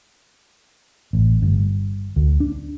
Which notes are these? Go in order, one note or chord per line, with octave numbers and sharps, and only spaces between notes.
A1
G1
D2
D4